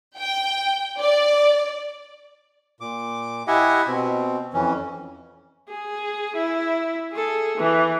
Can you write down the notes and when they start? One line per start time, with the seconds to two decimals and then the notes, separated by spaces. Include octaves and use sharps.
0.17 G5
1.00 D5
2.80 A#2 D6
3.47 E4 G4 D#5 E5 F#5 G#5
3.87 B2 C4
4.54 F2 E3 C#4
5.69 G#4
6.35 E4
7.12 G#4 A4
7.57 E3